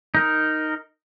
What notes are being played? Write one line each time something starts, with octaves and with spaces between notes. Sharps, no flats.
D#4 A#4